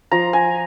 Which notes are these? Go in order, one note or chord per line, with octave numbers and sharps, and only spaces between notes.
F3 A#5
G#5